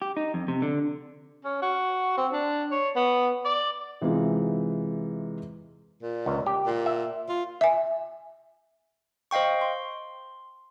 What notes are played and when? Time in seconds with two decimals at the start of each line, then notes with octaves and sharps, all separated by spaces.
0.02 G4
0.17 D#4
0.34 F2
0.48 C3
0.62 D3
1.45 C#4
1.62 F#4
2.18 C4
2.33 D4
2.71 C#5
2.96 B3
3.45 D5
4.01 C3 E3 G#3 D#4 F4
6.02 A#2
6.26 C#2
6.46 G4
6.66 A#2
6.86 E5
7.29 F4
7.61 E5 G#5
9.31 C5 D#5 F5 G5 C#6
9.61 C6